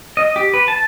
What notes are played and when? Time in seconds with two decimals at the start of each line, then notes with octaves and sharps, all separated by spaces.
0.17 D#5
0.36 G4
0.54 B4
0.68 A5